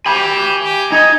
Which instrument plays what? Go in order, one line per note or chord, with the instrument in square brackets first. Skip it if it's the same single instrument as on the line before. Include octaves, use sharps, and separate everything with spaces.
[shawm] G4 [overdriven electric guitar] G#5 B5
[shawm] G4
[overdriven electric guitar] D#4 [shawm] G#5